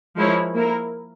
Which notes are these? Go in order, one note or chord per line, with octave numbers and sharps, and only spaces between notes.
F3 G#3 E4 A#4 C#5
A#3 E4 A#4